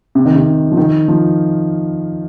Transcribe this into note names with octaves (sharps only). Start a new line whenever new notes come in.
C3
D#3
C3
F3
D#3
F3